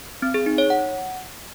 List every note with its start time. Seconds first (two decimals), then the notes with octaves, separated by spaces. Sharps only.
0.22 C4
0.34 G#4
0.46 D#4
0.58 C#5
0.70 F#5